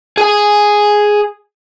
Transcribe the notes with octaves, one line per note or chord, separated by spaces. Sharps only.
G#4 G#5